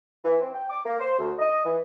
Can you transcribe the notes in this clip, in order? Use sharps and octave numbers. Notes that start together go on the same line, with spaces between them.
E3
C4
G5
D6
A#3
C5
D2
D#5
E3